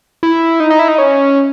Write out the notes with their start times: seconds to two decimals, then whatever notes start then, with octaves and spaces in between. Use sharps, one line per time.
0.23 E4
0.60 D#4
0.70 D#4
0.79 E4
0.88 D#4
0.98 C#4